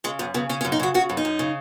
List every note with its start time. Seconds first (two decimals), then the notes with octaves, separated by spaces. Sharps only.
0.04 C#3 G#3
0.19 F#2 B3
0.34 C#3 B3
0.49 C#3 C#4
0.61 C#4
0.65 F#2
0.72 D#4
0.80 C#3 F#4
0.94 C#3 F#4
1.10 F#2
1.17 D#4
1.25 F#2
1.39 C#3